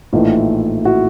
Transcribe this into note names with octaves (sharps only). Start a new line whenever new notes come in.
A#1 A2 E3 A3 D#4 F4
E4 F#4